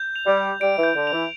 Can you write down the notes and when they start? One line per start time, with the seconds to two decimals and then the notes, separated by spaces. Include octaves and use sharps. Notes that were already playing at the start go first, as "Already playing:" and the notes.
Already playing: G6
0.16 F7
0.26 G3
0.37 G6
0.61 G3 D7
0.78 E3
0.83 G6
0.95 D3
1.07 F7
1.12 E3